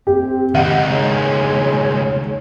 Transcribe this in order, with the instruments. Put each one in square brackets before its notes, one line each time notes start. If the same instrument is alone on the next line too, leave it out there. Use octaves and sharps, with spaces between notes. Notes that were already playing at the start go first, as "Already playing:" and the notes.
[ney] C4 [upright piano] G4
[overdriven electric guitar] C#2 D#3 [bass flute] D#5 [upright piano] F#5
[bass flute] G#3 [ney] C#5